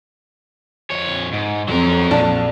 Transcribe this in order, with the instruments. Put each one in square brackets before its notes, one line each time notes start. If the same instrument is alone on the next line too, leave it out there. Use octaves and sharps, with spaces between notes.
[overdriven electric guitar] F2 C#5
G#2
[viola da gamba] F2 [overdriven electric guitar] F#3 A#4
[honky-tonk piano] A#1 D4 A5